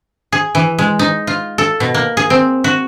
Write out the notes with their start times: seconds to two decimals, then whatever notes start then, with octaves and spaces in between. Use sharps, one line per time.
0.32 G#4
0.55 E3
0.79 G#3
0.99 D#4
1.27 F4
1.58 A4
1.80 B2
1.95 A#3
2.17 G#4
2.30 C4
2.64 F#4